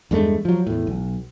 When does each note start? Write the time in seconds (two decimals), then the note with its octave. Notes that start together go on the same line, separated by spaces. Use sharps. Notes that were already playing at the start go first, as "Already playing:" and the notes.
0.11 E2 G2 G#3 A3
0.45 F3 F#3
0.67 E2 A2
0.87 B1